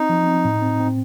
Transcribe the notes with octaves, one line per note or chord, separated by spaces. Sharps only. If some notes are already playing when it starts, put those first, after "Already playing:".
Already playing: C4 D#4
F3
C4
A2
C4
C4